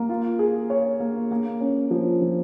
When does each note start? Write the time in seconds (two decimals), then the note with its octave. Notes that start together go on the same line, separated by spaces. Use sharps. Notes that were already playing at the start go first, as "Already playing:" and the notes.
Already playing: A#3
0.09 F4
0.39 G#4
0.70 C#5
1.00 A#3
1.31 A#3
1.60 C#4
1.91 F3
2.22 F3